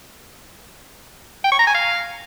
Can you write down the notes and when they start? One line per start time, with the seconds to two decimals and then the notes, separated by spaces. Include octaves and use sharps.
1.44 G5
1.52 C#6
1.59 A#5
1.67 G#5
1.74 F5